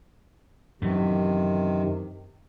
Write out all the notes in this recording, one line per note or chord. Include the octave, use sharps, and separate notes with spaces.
F#2 C3 D#3 E3